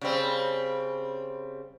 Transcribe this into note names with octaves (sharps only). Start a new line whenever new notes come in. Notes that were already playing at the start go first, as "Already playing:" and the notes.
C#3 G3 C4